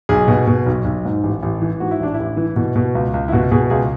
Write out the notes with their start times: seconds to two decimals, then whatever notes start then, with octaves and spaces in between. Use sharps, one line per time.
0.09 B1 G#4
0.28 B2
0.47 B2
0.66 B1
0.85 B1
1.05 G#2
1.23 A1
1.42 A1
1.62 E3
1.80 G#2 F#4
1.91 E4
2.00 A1 D4
2.14 A1 E4
2.37 E3
2.56 B2
2.76 B2
2.95 C#2
3.14 C#2
3.28 E4
3.32 B2 F#4
3.51 B2 G#4
3.70 C#2 G#4